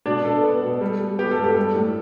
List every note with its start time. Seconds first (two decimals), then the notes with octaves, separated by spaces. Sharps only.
0.06 B2 D4 D5
0.25 B2 A4
0.43 B3
0.62 B2
0.81 G3
1.00 G3
1.19 B3 G4
1.31 A4
1.38 G2
1.44 G4
1.56 G3 A4
1.75 A2